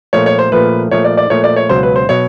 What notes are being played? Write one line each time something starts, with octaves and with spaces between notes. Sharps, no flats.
A#2 F3 A3 C#5
C#5
C5
A#2 F3 A3 B4
A#2 F3 A3 C#5
D5
D5
A#2 F3 A3 C#5
D5
C#5
C#2 B2 F#3 C5
B4
C5
B2 F#3 C#5